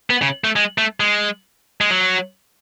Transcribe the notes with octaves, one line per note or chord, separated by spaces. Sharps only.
B3
C#3
A3
G#3
A3
G#3
G#3
F#3